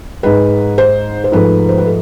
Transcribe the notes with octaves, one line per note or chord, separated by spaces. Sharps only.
G#2 G#3 B4
C5
C5
G#2 F3 A3 B4
C5
B4
A4